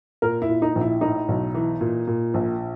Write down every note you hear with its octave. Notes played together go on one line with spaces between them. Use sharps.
A#2 A#4
E4
A#2
D#4
A#1
E4
A2 D#4
B1
E3
A#2
A#2
A#1